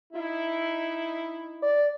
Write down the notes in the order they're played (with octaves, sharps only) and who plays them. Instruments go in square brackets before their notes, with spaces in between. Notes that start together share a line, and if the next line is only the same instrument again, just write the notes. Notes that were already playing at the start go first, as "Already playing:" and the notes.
[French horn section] D#4 E4
[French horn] D5